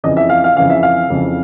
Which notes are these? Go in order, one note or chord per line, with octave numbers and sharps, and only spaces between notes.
F2 C#3 E3 D#5
E5
F5
F5
F2 C#3 E3 F5
E5
F5
F2 C#3 E3